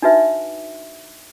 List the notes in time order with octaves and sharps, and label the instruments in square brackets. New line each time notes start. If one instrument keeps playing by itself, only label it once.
[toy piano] D4 D#4 F#4 B4 E5